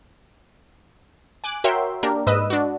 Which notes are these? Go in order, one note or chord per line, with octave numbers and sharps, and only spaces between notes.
G#5 D6 F#6
F#4 A#4 C#5 E5 G5 C6
A#3 D4 G4 A#4
G#2 B4 D#5 E6 D#7
D4 F#4